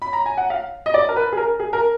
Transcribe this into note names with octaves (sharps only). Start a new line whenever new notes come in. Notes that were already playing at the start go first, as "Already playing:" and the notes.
B5
A#5
G#5
F#5
F5
D#5
D5
A#4
B4
G#4
A#4
G#4
A#4